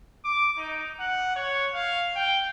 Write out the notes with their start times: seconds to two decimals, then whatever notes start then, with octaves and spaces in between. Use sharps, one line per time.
0.24 D6
0.57 D#4
1.00 F#5
1.36 C#5
1.74 F5
2.16 G5